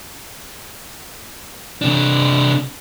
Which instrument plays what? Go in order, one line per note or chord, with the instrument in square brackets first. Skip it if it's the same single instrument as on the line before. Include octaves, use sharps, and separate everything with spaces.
[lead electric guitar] C3 D4